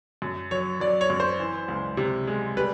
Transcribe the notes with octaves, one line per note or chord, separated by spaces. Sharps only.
F#2
F#3 C#5
F#3 D5
C#5
F#2
C5
E3
C#2
C3
G#3
G3 B4